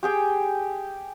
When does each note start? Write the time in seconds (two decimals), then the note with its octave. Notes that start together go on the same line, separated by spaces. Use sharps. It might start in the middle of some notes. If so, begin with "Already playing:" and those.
0.03 G4 G#4 G5